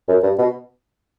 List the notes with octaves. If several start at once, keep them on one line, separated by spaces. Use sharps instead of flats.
F#2
G2
B2